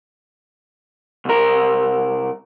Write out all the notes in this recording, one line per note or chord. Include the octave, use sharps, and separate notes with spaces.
C2 A#4